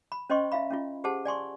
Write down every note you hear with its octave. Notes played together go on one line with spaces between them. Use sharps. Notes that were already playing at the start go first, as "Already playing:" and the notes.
B5
C#4 C5 D#5 G5 C6 C#6
E4 E5 F5 B5
C#4 E4 F4
G4 G#4 C5 F#5 A5
D5 G#5 C6 C#6